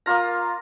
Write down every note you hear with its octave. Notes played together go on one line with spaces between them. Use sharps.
A#3 F4 A#5